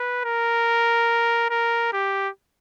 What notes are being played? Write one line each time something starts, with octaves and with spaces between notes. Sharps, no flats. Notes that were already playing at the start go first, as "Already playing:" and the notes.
Already playing: B4
A#4
A#4
G4